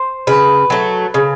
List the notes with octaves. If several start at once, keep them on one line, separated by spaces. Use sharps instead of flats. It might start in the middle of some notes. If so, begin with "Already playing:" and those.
Already playing: C5
C#3 B4
F#3 A3
C#3